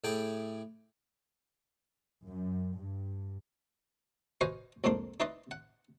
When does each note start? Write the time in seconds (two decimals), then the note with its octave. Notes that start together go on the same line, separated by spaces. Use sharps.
0.04 A2 E4 G#4 G5 A5 D6
2.27 F#2
2.78 G2
4.41 F#4 B4 C5 D#5 F5 G#5
4.84 C2 F2 G#2 A#3 D4 C6
5.20 D#4 E4 B4 D5 D#5 C6
5.51 F#5